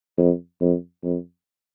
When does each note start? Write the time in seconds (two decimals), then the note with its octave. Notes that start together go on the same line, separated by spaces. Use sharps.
0.18 F2
0.61 F2
1.04 F2